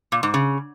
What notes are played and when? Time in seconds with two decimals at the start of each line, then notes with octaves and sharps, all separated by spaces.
0.12 A#2
0.23 G#2
0.34 C#3